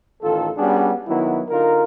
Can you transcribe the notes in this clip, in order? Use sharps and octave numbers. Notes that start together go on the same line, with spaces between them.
A1 D#3 F4 A4
G3 B3 C#4 D4 F#4 G#4
D#3 F#3 B3 E4
D3 D#4 F4 A#4